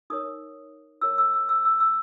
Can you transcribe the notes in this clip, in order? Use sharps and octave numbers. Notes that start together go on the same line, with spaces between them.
D#4 A#4 C#5 D#6
E4 A#4 C#5 E6
E6
E6
E6
E6
E6